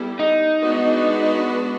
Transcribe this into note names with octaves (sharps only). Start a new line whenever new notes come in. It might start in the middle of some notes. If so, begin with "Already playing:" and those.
Already playing: G3 B3 E4 A4
D#4
G#3 B3 D4 F#4 B4